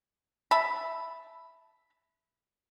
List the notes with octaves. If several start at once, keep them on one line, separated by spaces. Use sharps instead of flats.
E5 A5 B5